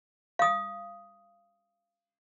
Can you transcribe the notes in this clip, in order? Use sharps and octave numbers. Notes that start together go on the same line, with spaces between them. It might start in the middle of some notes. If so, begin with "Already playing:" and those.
F5 D#6